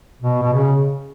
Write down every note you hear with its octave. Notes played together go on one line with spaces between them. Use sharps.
B2
B2
C#3